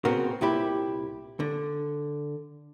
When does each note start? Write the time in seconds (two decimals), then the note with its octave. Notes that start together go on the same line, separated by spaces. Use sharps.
0.05 A#2 C#3 B3 C4 F#4 A#4
0.41 C2 A#2 E4 G4 B5
1.40 D3